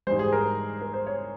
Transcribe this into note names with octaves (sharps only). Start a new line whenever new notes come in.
G#2 E3 G3 C5
G#4
A#4
A#4
C5
C#5